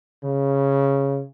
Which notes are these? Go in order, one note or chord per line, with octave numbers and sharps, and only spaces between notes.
C#3